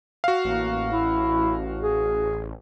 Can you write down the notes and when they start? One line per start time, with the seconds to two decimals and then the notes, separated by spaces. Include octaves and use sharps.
0.24 F#4 F5
0.45 A1 A#3
0.92 E4
1.81 G#4